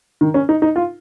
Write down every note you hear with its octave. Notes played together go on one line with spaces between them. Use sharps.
D#3
C#4
D#4
D#4
F4